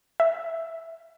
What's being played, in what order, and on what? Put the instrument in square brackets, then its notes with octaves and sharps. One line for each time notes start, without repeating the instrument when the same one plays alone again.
[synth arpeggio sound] E5